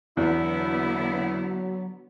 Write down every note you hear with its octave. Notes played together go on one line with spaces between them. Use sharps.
E2 D3 F#3 B3 E4